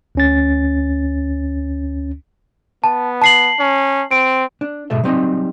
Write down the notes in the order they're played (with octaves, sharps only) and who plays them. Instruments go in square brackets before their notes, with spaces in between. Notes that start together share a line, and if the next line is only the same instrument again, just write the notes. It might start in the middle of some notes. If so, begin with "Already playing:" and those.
[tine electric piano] D2 C#4 A6
[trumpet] B3 [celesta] A5
[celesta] A5 C7 F#7
[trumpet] C#4
[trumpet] C4 [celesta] D7
[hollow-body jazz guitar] D4
G#2 B2 A4 E5
F#3 G3 C4 D#4 D#5